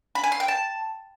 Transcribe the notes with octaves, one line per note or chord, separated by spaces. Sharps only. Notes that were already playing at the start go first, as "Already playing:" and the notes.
B5
G#5
C6
G5
A5